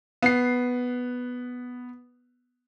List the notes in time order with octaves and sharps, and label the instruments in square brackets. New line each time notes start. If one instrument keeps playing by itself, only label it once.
[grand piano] B3 C7